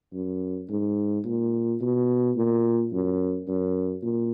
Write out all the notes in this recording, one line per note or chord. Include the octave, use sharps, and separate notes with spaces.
F#2
G#2
A#2
B2
A#2
F#2
F#2
A#2